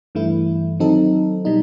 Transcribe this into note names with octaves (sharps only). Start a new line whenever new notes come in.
G2 E3 A3 E4
D#3 F#3 C4 D#4 A4
B2 G3 D#4